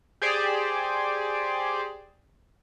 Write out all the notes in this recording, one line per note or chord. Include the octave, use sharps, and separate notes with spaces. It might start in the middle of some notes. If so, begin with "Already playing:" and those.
G4 G#4 C5 D5